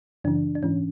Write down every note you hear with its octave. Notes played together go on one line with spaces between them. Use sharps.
F#2 C#3 E3 D4
D4
G#2 E3 C#4